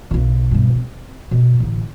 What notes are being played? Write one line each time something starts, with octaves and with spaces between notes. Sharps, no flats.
B1 C#3
G2 B2
C4
B2
A1 D3